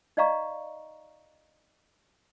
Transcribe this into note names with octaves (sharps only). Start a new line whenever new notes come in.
D#4 D5 D#5 F5 A#5 C#6